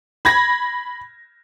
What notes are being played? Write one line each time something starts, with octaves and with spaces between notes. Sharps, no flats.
B5 G#6 A#6